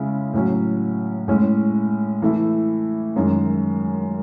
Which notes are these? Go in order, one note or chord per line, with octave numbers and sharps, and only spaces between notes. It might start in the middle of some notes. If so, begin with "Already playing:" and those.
Already playing: C#3 G#3 C#4 E4
A2 F#3 C#4
A2 G#3 C#4
E3 A3 E4
F#2 D#3 G#3 C#4